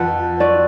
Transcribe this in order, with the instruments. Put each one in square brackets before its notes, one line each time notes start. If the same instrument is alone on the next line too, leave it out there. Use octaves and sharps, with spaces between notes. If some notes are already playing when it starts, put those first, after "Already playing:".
Already playing: [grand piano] F2 F3 [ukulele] B4 F#5 A5
[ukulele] F#4 B4 D5